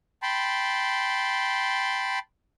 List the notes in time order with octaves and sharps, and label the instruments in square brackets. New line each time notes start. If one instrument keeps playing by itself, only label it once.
[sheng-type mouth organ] G5 A5 B5 C6